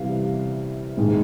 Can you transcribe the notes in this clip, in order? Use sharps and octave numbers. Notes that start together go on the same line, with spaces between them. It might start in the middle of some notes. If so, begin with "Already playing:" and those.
Already playing: C3 E3 G3 F5
G#2 D#3 G#3